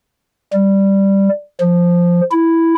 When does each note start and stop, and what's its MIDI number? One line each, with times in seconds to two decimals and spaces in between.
0.53 1.29 55
1.61 2.21 53
2.32 2.75 64